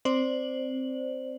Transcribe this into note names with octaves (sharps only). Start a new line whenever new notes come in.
C4 C5 D5 F#7